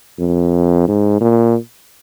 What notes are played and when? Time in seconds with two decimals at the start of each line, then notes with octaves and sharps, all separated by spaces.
0.20 F2
0.88 G#2
1.21 A#2